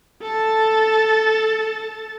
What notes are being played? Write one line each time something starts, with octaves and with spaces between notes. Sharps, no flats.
A4 A5